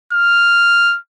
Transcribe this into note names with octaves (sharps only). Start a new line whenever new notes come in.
F6